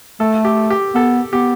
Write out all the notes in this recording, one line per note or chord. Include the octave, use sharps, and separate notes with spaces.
A3 A4
G4
G4
B3 A4
B3 G4